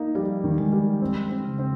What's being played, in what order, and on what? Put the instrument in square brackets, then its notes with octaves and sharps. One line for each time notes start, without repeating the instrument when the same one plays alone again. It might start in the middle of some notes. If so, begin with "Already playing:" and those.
Already playing: [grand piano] A#3 D#4
[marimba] F3 [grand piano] G3
[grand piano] D#3
[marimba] G#3
[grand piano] G3
C4
C4
[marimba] C#3
[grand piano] C4